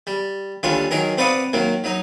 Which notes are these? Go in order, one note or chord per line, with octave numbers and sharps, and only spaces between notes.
G3
D#2 D3 G3 F4 C#5 G#5
D#3 F#3 G#4 A#4
C4 B4 D5 F5 F#5 D#6
D#3 F#3 A#3
F#3 D#4